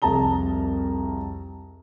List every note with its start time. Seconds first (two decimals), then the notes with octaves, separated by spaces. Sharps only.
0.02 C2 F2 G#4 A5 A#5 G7